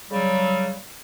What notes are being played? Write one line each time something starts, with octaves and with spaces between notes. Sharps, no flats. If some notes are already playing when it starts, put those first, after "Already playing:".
C#3 F#3 G3